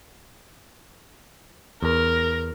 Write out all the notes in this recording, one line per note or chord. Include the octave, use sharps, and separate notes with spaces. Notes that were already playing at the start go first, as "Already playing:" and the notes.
E2 A#4